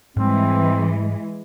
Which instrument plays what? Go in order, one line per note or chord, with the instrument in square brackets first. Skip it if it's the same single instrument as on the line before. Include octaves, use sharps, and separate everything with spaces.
[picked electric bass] G#2 G3 [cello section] E3 G#3 [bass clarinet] C4